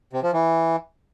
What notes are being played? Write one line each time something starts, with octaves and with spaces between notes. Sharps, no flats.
C3
F3
E3